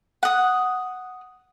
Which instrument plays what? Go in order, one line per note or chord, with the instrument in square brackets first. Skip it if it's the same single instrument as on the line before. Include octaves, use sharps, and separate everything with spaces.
[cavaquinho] F#5 D#6